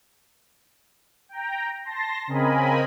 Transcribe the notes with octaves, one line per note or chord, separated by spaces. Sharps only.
G5 A#5
A5 C6 A#6
C#3 C4 A#4 D#5 G#5 B5